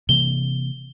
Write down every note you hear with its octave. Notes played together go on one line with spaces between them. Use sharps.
C3 E3 A#3 G7